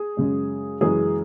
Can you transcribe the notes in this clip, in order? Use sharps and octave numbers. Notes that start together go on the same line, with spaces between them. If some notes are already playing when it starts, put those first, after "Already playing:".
Already playing: G#4
F#2 C#3 G#3
F#2 C#3 E3 G#3 G#4